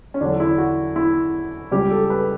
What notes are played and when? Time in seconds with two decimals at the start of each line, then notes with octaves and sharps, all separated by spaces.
0.14 C#4
0.21 E2 D3 F#3 D4
0.40 E4
0.58 F#4
0.96 E4
1.71 C#2 C#3 G3 G4
1.91 A4
2.10 B4